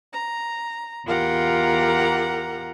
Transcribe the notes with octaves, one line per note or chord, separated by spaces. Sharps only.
A#5
E2 F4 G4 A#4 F#5 A#5